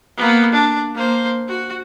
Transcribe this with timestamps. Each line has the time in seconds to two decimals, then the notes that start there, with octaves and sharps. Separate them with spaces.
0.18 A#3 B3
0.52 D4
0.95 A#3 C5
1.48 F#4